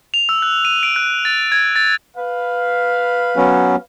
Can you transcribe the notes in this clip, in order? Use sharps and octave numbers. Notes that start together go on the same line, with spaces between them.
F7
E6
F#6
D#7
D7
F#6
A6
G#6
A6
B4 F5
F#3 B3 C#4